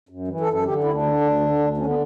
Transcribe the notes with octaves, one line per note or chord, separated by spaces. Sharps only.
F#2
E3
A4
F#2
A4
D3 G4
D2 E4
D4
D3
D2
D3
D2
D3 C#4
B3